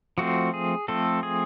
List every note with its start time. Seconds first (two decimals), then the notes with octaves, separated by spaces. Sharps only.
0.18 F3 A3 C4 F#4
0.54 G#4
0.88 F3 A3 C4 A4
1.23 G#4